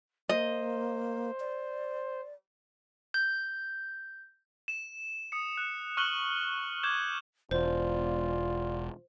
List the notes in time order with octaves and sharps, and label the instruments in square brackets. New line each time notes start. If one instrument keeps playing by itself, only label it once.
[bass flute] A#3 [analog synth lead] C5 [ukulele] D#5
[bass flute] D5
[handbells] G6
[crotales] E7
D#6 C#7
F#6
C#6 F6 F#6 F#7 G7
D6 G6 G#6 E7
[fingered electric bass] E1 [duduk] F4 [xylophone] C5 [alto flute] D5